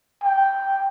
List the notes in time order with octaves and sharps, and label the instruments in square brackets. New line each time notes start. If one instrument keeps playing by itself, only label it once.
[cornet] G5